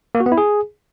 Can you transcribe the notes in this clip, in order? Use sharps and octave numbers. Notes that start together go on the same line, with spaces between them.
A#3
F#4
B3
E4
G#4